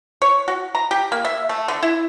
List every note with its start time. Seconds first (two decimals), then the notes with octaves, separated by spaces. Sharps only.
0.22 C#5
0.48 F#4
0.75 A#5
0.91 G4
1.12 A#3
1.25 E5
1.49 A3
1.68 D3
1.83 E4